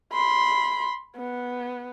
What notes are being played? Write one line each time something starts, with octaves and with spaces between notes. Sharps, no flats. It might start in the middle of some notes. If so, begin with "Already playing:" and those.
B5 C6
B3